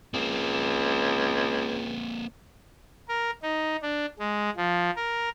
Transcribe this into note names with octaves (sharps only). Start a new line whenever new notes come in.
C#2 A#3 C4
A#4
D#4
D4
G#3
F3
A#4